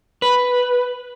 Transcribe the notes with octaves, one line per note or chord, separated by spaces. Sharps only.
B4